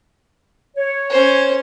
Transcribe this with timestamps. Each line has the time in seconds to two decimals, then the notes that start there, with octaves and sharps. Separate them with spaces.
0.76 C#5
1.10 C#4 C5